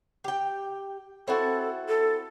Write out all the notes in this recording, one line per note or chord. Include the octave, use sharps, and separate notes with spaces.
G4 G5
C4 E4 F#4 A4
A4